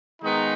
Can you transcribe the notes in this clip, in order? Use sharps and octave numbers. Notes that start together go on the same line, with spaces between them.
D#3 G#3 B3 D#4